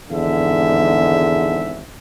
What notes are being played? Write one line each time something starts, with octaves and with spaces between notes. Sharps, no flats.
G#1 E2 G#2 D3 E5